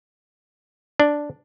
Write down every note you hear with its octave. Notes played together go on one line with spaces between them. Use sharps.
D4